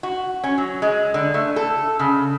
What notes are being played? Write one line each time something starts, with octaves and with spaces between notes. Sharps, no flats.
F#4
C#4
F#3
G#3
D3
A3
A4
C#3